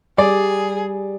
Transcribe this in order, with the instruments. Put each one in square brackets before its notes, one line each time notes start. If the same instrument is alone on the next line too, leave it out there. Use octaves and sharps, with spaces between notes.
[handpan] G3 [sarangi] G#4 [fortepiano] D5